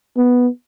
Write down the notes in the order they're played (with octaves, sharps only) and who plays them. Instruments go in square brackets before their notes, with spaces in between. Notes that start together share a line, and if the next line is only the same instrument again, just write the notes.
[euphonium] B3